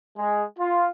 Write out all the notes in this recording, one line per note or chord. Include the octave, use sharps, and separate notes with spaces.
G#3
F4